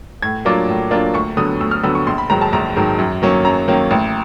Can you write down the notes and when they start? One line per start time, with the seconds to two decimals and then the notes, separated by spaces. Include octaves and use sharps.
0.22 A2 G#6
0.45 F#3 A#3 D4 F4 D6
0.69 A2
0.91 F#3 A#3 D4 F4
1.14 D2 C#6
1.37 D3 F#3 B3 D#6
1.61 D2 E6
1.71 F6
1.83 D3 F#3 B3 E6
1.95 C#6
2.06 A#1 C6
2.18 B5
2.29 G#2 D#3 F#3 A#5
2.41 A5
2.53 A#1 A#5
2.76 G#2 D#3 F#3
2.99 F#2
3.22 D#3 F#3 A#3 C#4
3.45 F#2 A#5
3.68 D#3 F#3 A#3 C#4
3.91 A1